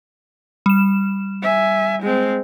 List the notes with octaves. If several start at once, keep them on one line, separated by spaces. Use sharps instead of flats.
G3 E7
E5 G#5
G#3 C4